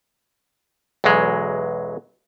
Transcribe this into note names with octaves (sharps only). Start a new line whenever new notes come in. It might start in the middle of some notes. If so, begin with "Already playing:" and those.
B1 E2 E3 F#3 G#3